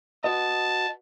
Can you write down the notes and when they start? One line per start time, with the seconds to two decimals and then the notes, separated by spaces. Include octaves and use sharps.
0.24 F#4 B4 D#5 A5